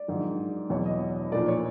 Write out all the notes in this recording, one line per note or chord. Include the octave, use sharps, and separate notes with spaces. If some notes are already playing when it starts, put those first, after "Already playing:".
Already playing: D5
A#1 G#2 D#3 F#3
E2 B2 F#3 C#5
D#5
B1 A#2 F3 D5
C#5